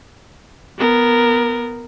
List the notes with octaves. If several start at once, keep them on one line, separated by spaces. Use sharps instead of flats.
B3 A#4